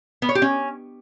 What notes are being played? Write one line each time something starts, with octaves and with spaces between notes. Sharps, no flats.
B3
C#5
G4
C#4